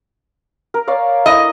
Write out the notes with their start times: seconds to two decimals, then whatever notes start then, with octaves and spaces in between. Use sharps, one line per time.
0.74 A#4
0.88 C#5 D5 F5
1.26 E4 D#5